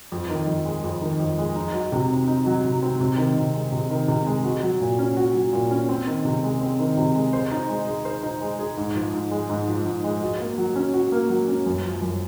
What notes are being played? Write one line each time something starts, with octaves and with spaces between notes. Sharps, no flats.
F2
D#3
F2
G#3
F2
D#3
F2
G#3
D#4
F#3
C3
C4
D#4
F#3
C3
C4
C3
D#3
C3
G#3
C3
D#3
C3
G#3
F#4
F#3
A#2
C#4
F#4
F#3
A#2
C#4
C4
D#3
C3
G#3
C4
D#3
C3
G#3
C5
D#4
G#3
G#4
C5
D#4
G#3
G#4
G#2
F3
G#2
G#3
G#2
F3
G#2
G#3
F#4
A#3
F#3
C#4
F#4
A#3
F#3
C#4
F#2
F3
F#2